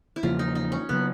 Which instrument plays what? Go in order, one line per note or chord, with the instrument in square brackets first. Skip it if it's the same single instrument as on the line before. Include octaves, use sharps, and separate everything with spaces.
[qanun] E4
[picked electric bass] E2 C#3 F3 A#3 [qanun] F4
[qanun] D#4
D#4
C#4
[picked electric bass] C#3 F#3 [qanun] B3